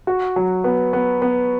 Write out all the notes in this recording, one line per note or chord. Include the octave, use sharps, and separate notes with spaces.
F#4
F#3
B3
B3
B3